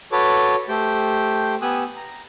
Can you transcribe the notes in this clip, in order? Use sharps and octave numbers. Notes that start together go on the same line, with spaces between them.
F#4 A4 B4 C#5 D6
A3 G4 C5 G5
B3 G4 G#5 D#6 E6 F#6
A#5